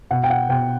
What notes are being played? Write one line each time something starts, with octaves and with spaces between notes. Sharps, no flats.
B2 F#5
G5
F#5
B2 G5